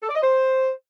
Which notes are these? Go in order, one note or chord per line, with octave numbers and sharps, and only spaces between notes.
A4
D5
D#5
C5